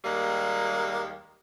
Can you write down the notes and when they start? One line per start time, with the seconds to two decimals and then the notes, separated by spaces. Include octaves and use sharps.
0.05 D#2 G3 G#3 A#3